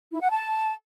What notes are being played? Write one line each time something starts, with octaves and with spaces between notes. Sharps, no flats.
E4
F#5
A5